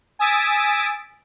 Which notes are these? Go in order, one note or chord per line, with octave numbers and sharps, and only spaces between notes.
G#5 D#6 E6 A6 B6 D7